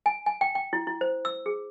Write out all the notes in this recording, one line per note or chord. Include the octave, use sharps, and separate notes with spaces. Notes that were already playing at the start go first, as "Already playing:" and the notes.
G#5
G#5
G5
G5
E4
E4
C5
E6
G#4